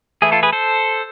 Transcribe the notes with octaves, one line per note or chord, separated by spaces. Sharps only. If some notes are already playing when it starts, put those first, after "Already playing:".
E3 A3 E4 G#4
F4 A4
G#4 B4
A4 C5